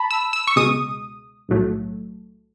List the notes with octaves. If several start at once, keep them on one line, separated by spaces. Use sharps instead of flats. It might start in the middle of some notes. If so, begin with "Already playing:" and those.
Already playing: A5 B5
E6
E6
C#6
C#2 B2 G#3 D#6
B1 A2 F#3 A3